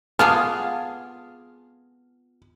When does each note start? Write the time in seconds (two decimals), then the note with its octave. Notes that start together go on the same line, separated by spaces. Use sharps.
0.19 B3 F4 G#4 G#5 A5 D6 F6